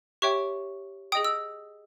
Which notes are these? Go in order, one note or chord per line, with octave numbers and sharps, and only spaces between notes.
G4 C#5 E5 G5 C#6
G#4 D#5 G5 D#6
E6